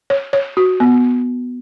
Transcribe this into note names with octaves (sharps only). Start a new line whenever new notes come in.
C#5
C#5
F#4
B3